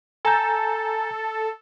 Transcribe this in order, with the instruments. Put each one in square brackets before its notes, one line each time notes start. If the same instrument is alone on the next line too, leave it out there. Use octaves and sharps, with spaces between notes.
[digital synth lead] A4 [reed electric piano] G#5 A#5 G6